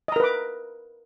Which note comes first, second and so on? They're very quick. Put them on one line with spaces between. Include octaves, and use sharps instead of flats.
D#5 A#5 A#4 B4 D6